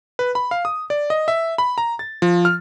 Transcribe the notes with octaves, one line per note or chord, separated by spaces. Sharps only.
B4
B5
F5
D#6
D5
D#5
E5
B5
A#5
A6
F3
F6